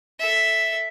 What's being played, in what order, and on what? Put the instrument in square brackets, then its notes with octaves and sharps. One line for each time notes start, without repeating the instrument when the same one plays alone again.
[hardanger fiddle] A4 E5